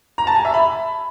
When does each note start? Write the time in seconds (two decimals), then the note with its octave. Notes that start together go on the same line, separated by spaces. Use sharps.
0.18 A#5
0.27 A5
0.36 G#5
0.45 E5
0.54 B5